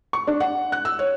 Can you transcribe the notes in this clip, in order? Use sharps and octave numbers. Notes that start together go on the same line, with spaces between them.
C#6
D4
F#5
F#6
E6
C#5